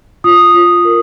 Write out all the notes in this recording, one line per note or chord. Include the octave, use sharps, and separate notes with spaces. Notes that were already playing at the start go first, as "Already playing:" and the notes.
F4 D#6
F4
A#4